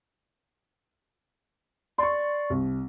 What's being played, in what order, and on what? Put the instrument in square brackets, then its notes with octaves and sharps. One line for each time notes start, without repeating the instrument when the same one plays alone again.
[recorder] D5 [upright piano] C6 C#6
[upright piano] C2